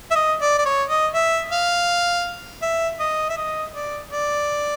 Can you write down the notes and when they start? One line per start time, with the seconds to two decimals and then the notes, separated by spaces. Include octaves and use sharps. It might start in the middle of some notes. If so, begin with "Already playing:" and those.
0.11 E5
0.16 D#5
0.41 D5
0.59 D5
0.66 C#5
0.90 D#5
1.14 E5
1.52 F5
2.62 E5
3.00 D#5
3.30 E5
3.37 D#5
3.75 D5
4.11 D5